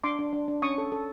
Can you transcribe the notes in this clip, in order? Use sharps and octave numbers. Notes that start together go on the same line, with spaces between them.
D4 C6 D6
D4
D4
D4
C#4 C#6 D#6
A4
A4